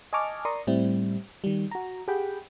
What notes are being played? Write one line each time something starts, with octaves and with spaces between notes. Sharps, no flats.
D#5 G#5 A5 C#6 D6 F6
A#4 D5 A#5 C6 C#6 D#6
A2 G3 C4 E4
D#3 G3
F#4 A#5
G4 G#4 F#5 G5 B5